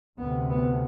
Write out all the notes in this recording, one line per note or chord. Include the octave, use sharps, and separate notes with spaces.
D2 C3 B3
B3